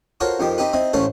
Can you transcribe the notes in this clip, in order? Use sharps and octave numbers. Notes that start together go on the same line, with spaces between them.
F4 F#4 A4 A#4 C5 C#5
F2 D#3 F3 G4
C4 D#4 G4 B4
C4 D#4 E4
A1 E3 A3 C#4 A4 C5